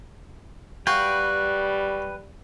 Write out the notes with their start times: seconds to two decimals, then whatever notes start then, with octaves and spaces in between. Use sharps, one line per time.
0.87 G3 F#4 B4 F5 G5